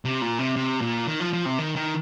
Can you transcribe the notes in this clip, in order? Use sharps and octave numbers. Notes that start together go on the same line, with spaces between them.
C3
A#2
C3
C3
A#2
D#3
F3
F3
C3
D#3
D#3